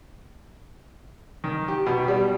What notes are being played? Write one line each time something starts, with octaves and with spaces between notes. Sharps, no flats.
D#3
G4
B2
G3